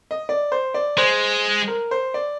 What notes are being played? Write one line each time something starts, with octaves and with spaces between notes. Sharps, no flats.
D#5
D5
C5
D5
G#3 C5
A#4
C5
D5